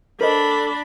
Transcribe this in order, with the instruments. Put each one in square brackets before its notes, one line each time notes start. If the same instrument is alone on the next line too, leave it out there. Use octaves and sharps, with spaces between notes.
[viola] D4 B5 [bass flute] A4 [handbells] A#4 C5 D#5